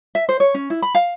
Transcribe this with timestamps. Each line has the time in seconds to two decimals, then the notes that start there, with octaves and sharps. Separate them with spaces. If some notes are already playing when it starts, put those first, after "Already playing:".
0.15 E5
0.29 C5
0.40 C#5
0.54 C#4
0.70 E4
0.82 B5
0.95 F5